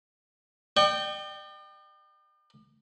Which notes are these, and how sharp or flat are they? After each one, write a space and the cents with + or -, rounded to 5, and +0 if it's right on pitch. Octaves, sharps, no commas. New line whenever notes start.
D5 +45 G5 -10 C#6 +0